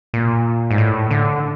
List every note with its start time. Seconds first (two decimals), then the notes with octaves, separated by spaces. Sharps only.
0.14 A#2
0.71 G#2
0.78 A2
1.11 D3